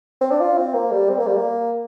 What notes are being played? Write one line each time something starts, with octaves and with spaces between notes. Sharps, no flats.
C4
D4
F4
C4
A#3
G3
C4
A#3
G3
A#3